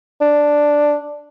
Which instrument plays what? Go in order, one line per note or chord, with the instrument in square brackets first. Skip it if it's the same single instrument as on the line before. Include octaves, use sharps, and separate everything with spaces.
[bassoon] D4